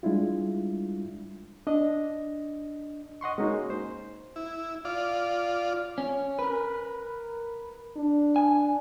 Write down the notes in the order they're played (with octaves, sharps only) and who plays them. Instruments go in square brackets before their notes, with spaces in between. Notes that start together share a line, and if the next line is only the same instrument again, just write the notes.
[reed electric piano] G3 G#3 D4 E4 F4
D4 D#5
D#5 F#5 C6 C#6
G#3 A#3 C#4 D#4 F#4
C5
[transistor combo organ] E4
F4 D5
[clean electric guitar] C#4
A#4 B4
[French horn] D4
[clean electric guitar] G#5